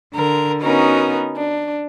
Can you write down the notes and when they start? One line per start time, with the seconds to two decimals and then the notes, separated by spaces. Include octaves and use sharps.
0.15 D3 A#4
0.61 B3 C#4 D#4 F#4 A#4 B4
1.37 D4